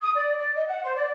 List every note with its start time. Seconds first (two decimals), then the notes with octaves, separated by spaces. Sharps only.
0.01 D#6
0.15 D5
0.38 D5
0.55 D#5
0.67 F#5
0.83 C5
0.95 D5